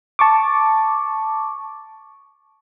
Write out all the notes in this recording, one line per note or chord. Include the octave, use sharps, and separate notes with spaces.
A5 C#6 D6